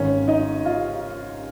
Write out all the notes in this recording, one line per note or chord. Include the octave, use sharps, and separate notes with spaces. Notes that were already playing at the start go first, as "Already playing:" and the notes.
Already playing: G#1 G#2 D#3 C#4 C#5
D#4 D#5
F4 F5